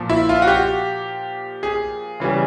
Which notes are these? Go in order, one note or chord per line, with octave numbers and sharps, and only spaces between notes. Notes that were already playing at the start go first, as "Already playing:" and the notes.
Already playing: A#2 F3
E4
F4
F#4
G4
G#4
C#3 E3 G3